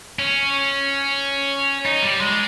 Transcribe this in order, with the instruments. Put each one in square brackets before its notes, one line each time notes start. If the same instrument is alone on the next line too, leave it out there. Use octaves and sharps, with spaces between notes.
[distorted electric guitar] C#4
D#4
G3
G#3